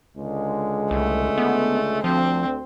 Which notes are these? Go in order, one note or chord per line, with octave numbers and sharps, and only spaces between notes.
C#2 D3 G#3
C2 A3
B3
D2 F3 C4